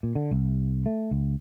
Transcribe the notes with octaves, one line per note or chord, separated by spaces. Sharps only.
A#2
D3
C2
A3
C#2